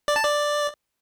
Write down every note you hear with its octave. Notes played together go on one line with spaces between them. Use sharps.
D5
A5
D5